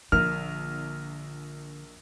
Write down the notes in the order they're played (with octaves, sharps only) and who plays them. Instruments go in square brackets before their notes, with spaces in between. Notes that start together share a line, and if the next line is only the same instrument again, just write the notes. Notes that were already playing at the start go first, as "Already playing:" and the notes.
[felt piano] A#1 A#4 [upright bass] D3 [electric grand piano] F6